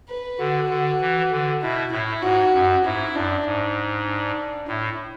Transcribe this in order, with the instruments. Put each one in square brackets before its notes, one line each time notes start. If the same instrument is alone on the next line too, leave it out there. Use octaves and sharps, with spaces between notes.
[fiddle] B4
[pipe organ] D3 [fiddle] F#4
[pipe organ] D3
E3
D3
[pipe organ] B2 [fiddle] E4
[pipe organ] A2 [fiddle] E4
[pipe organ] G#2 [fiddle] F#4
[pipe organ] F#2
[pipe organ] G#2 [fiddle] E4
[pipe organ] F#2 [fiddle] D4
[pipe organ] G#2
[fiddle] D4
[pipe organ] A2 [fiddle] E4